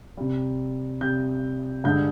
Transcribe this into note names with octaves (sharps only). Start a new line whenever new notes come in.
C3 G3
C3 G3 G6
G2 D3 G#3 G6